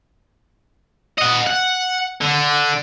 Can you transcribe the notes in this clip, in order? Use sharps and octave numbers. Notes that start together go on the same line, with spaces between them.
D#5 F#5
F#5
D3